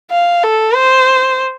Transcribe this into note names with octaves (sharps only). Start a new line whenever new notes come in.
F5
A4
C5